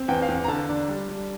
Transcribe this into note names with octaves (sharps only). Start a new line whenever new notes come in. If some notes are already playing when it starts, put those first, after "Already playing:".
Already playing: C4
E2 G5
F5
E2
F5
A#5
D3 A5
D4
G3
G3